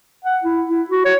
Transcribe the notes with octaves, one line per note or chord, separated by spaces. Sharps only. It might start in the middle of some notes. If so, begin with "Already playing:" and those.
F#5
E4
E4
F#4
C#5